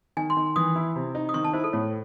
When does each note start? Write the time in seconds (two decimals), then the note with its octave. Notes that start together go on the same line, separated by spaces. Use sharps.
0.17 D#3 G#5
0.30 C6
0.37 D#3
0.56 E3 D#6
0.75 E4
0.96 C3
1.15 D#4
1.29 D#6
1.34 D#3 C#6
1.44 A5
1.53 E4 C5
1.64 A4
1.73 A2 C#5